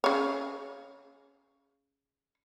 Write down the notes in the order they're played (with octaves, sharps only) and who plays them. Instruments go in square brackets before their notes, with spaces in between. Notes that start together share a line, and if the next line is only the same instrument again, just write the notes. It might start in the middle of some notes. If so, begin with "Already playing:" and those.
[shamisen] C#3 C#5